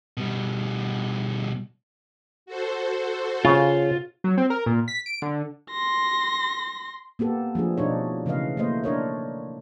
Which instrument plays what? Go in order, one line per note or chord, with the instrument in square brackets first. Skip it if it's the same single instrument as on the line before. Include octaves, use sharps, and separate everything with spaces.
[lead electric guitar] B2 G3
[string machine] F#4 A4 C5
[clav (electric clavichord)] C#3 [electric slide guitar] F4
[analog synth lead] F#3
C4
A#4
A#2
B6
D7
D3
[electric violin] C6 A#6
[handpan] A#3 B3 G4 A4
F3 A3 D4 G#4
B2 D4 D#4 C#5
C#3 E3 A3 B4 D#5 F5
A3 A#3 E4 C5 D#5
D4 A#4 C#5 D#5